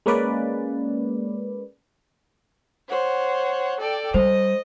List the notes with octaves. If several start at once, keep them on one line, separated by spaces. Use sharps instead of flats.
G#3 A#3 C#4 B4 D5
C5 C#5 F#5
A4 D5 G5
G3 C5 D#5